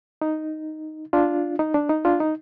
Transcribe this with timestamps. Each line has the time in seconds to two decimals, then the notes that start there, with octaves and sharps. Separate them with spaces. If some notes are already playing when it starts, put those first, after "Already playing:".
0.22 D#4
1.13 D4 F4
1.59 D#4
1.74 D4
1.90 D#4
2.05 D4 F4
2.20 D#4